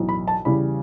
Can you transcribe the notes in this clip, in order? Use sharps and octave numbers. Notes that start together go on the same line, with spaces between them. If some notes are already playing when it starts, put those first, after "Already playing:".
Already playing: B1 A2 E3
B5
A5
E2 C#3 E3 G3 B5